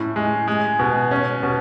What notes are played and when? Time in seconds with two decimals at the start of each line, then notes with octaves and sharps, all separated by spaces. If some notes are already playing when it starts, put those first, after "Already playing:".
Already playing: A2 C#4
0.16 G#3
0.48 G#3
0.79 B2
1.11 C#4
1.43 B2